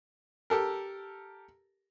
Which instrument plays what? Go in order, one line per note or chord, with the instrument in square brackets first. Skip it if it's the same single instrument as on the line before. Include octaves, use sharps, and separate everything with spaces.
[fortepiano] G4 A4 A#4